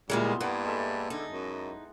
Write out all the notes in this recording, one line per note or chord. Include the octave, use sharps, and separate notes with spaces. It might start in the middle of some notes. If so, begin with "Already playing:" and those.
D2 A#2 G3 G#3 E4
B3 C6
G2 A#3 F#5
G#3 A4 E5
D3 D#4
F#2